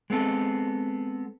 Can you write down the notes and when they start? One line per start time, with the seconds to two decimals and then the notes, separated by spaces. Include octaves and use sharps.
0.10 G#3 B3 C4 A4